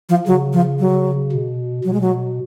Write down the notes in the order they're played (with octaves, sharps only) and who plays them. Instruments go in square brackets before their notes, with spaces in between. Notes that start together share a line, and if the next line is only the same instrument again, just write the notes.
[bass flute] F3
[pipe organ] C#3 [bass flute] F#3
[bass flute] F3
F#3
[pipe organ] B2
[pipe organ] B2 [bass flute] F#3
[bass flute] G#3
F#3